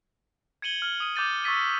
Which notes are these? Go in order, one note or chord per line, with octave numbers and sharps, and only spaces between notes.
G#6 C#7 D#7 F#7 G7
F6 G7
D#6 D#7
D6 G6 A6 D#7
C#6 E6 A6 B6 D#7